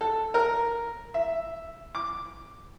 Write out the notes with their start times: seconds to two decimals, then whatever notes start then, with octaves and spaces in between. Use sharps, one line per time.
0.01 A4
0.34 A#4
1.14 E5
1.95 D6